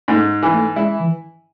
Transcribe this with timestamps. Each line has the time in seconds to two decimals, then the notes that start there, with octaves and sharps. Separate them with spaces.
0.08 G#2 A3
0.43 E3
0.53 A3
0.76 G#3 E4
0.99 E3